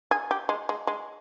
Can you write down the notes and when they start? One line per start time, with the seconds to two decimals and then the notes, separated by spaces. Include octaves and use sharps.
0.11 G#4
0.31 G4
0.49 G#3
0.69 G#3
0.87 G#3